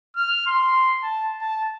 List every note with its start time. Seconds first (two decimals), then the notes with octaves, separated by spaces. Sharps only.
0.16 F6
0.47 C6
1.03 A5
1.41 A5